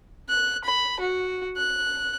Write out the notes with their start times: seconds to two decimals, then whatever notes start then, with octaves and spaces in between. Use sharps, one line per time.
0.29 F#6
0.64 B5
1.00 F#4
1.57 F#6